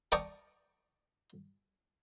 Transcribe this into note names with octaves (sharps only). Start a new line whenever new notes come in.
A#4 D5 G5 A5 C#6 D#6